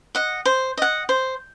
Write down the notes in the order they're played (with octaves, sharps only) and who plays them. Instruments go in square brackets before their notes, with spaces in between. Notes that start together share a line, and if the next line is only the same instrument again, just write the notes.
[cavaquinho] D#5 F#5
C5
D#5 F#5
C5